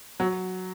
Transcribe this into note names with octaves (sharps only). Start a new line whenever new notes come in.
F#3